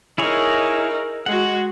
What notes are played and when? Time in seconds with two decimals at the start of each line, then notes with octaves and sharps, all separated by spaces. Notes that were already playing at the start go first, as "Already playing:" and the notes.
0.18 D#4 E4 G#4 A#4 C#5
1.26 G#3 F#4 F#5